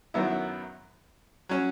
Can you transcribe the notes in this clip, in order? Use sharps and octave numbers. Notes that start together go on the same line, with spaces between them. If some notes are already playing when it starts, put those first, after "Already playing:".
F#2 D#3 F#3 B3 E4
F#3 C#4